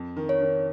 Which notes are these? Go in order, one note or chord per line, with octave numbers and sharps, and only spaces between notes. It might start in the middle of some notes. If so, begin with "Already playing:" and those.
Already playing: F2
D#3
C#5
D#3